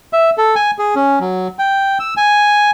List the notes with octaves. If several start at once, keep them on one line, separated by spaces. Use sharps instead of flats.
E5
A4
G#5
G#4
C#4
F#3
G5
E6
G#5